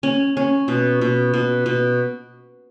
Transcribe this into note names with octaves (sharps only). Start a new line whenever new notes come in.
C#4
C#4
B2
B2
B2
B2